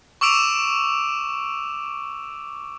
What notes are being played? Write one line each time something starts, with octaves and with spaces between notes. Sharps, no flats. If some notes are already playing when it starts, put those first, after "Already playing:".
C#6 D6 E6 D7 E7 F7